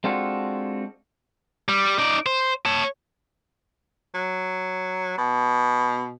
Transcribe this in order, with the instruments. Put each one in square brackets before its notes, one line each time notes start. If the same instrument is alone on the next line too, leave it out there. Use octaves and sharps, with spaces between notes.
[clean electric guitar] G#3 C4 D4 F4 F#4 A4
[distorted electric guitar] G3
D#4 D5
C5
C#5 A5
[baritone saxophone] F#3
B2